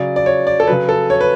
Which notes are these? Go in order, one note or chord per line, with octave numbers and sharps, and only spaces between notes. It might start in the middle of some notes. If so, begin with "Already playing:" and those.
Already playing: C#3 F#3 D5
D5
C#5
D5
A4
C#3 F#3 B4
A4
C#5
B4